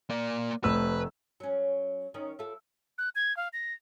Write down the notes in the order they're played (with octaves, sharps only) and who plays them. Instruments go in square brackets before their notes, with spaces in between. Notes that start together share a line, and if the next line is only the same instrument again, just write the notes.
[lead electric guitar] A#3 D5
[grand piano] F1 A3 E6 [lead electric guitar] B4
[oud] F#3 C#4
D#3 C#4
E4 F4 A4
[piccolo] F#6
G#6
F5
A#6